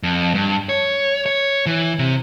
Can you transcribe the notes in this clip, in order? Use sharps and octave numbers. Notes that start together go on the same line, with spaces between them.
F2
G2
C#5
C#5
E3
C3